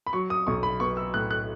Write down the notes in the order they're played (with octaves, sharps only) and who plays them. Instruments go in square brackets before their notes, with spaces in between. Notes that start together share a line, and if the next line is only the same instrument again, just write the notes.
[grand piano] B5
F#3 C#6
D#6
B1 C#6
B5
B3 C#6
E6
A2 F#6
F#6